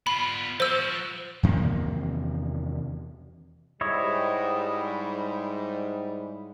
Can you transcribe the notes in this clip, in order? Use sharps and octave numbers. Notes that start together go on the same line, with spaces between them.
B3 F4 B5
F3 F#4 C5 E6
E2 C3 D#3 A#3
G#2 G3 E4 C#5 D#5